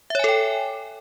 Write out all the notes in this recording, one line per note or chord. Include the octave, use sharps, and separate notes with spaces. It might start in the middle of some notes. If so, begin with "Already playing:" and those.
A4 C#5 E5 G5 G#5